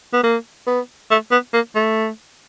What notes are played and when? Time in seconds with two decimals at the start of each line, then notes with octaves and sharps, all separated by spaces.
0.13 B3
0.23 A#3
0.67 B3
1.11 A3
1.31 B3
1.53 A#3
1.75 A3